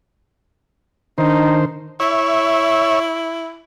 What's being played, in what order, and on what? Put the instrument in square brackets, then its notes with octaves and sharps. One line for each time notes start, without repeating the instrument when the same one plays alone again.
[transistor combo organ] D#3 C5 [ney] D4 [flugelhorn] D#4
[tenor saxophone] E4 [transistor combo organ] C#5 E5